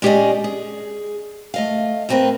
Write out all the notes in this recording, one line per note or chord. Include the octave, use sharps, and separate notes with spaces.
G#3 C#4 G4 G#4 D5 D#5
G#4
A3 D#5 F5
A3 A#3 C4 A#4 B4